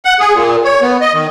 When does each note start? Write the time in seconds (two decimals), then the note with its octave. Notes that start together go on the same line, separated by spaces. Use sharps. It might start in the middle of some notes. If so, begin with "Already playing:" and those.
0.05 F#5
0.20 G#4
0.34 A#2
0.65 C#5
0.82 B3
1.01 D#5
1.14 D#3